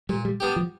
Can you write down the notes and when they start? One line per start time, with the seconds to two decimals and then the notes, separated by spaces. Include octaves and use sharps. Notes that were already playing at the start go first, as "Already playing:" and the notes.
0.09 A#2 G3
0.25 G3
0.40 G3 B3 D4 G4
0.56 F3